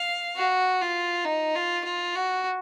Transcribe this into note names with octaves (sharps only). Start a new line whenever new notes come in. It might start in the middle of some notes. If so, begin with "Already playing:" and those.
Already playing: F5
F#4
F4
D#4
F4
F4
F#4